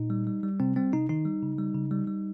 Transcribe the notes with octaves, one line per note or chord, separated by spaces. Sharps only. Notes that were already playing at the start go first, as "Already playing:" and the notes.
Already playing: A#2 D#4
G3
G3
G3
C3 C4
G3 C4
C3 D#4
D#3 D#4
G3
C#3
G3
C#3
G3
G3